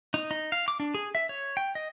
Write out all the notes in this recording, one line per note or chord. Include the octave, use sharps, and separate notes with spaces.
D#4
D#4
F5
D6
D4
G#4
E5
C#5
G5
D#5